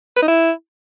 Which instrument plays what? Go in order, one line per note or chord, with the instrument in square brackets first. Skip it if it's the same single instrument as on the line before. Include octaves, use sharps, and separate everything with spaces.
[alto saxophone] B4
D#4
E4